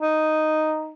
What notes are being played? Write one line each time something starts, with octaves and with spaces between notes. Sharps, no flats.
D#4